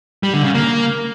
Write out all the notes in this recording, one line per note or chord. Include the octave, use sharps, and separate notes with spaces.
G3
D3
C#3
A#3